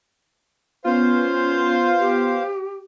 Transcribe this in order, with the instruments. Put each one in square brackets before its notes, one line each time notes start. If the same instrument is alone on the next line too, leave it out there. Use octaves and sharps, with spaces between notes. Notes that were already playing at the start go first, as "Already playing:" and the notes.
[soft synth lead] B3 [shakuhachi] C#4 [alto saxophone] F4 [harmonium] C5 F5
[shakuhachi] G4